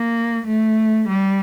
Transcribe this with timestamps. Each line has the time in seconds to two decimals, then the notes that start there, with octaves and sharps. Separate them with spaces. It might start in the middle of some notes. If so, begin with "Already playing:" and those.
Already playing: A#3
0.47 A3
1.09 G3